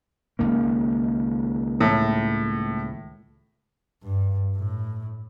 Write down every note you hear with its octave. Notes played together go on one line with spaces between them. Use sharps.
C#2 D#3 A#3
A2
G2
A2